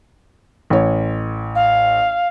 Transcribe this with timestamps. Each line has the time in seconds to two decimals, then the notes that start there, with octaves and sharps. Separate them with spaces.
0.70 A1 C#5
1.55 F5